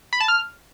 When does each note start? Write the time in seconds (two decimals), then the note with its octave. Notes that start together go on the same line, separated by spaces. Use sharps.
0.13 B5
0.20 A5
0.28 F6